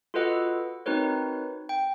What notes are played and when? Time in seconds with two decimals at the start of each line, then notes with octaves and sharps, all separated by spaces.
0.14 F4 F#4 A4 B4 D#5 F#5
0.86 C4 D#4 F#4 A#4 B4 C#5
1.69 G5